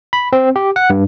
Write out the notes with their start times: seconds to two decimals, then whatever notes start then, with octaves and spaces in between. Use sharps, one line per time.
0.13 B5
0.33 C4
0.56 G4
0.76 F#5
0.90 G2